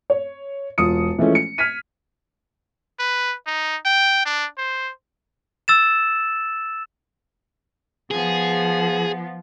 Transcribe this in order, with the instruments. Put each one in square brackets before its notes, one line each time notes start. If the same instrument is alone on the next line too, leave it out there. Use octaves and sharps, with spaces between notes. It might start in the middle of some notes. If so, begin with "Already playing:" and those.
[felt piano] C#5
E1 F4 D#6 C#7
E3 F3 G#3 A3 C#4
C#7
F6 G#6 B6 D#7
[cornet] B4
D#4
G5
D4
C5
[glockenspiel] E6 A6 E7
[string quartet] F3 B3 [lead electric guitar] G#4